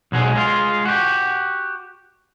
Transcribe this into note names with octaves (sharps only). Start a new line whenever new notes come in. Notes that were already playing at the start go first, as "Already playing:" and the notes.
B1 F#3 G#3
G#3 F4
F#4 G4